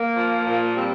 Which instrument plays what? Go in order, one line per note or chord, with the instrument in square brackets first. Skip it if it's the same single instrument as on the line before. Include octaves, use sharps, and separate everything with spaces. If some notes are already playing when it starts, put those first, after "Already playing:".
Already playing: [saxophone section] A#3
F3
A#2
G3 C4